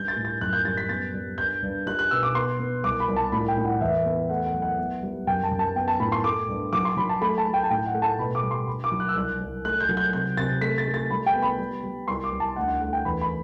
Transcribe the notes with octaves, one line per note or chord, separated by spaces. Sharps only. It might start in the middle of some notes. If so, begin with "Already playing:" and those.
Already playing: G2 G3 G6
A6
A2
A6
F#2 F#6
G6
G3 A6
B6
B3 A6
G3
G2 G6
G2
G3 F#6
F#6
B2 E6
D6
B3 C6
B3
C2 D6
B5
C2
A5
A2 B5
G5
A2
F#5
E2 E5
B3
A3 F#5
F#5
F#3
F#5
B3
G3
F#2 G5
A5
F#2
A5
B3 G5
A5
A2 B5
C6
A3 D6
G2
F#3 D6
C6
F#3 B5
A5
A3 B5
A5
A3
G5
A5
A2 G5
F#5
A3
A5
B2 B5
D6
G3
C6
G2 B5
D6
F#3
F#6
E6
C2 F#6
C2
A3 F#6
G6
F#3
G6
C3 G6
C3 A6
A3 B6
A6
A3
A6
G3 B5
G5
B3
B5
G3
G3
C2 C6
D6
C2
A5
D2 F#5
F#5
A3 F#5
G5
E2 B5
B5